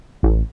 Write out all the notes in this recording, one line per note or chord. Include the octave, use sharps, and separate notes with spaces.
A1